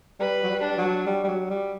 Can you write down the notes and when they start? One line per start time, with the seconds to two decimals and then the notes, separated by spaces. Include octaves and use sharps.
0.20 G3 B4
0.43 F#3
0.49 G3
0.63 D4
0.70 G3
0.78 F#3
1.07 G3
1.24 G3
1.29 F#3
1.50 G3